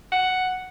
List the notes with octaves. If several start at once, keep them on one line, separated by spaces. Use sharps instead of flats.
F#5